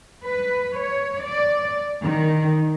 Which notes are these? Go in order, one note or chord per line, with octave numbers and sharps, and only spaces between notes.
B4
C#5
D5
D#3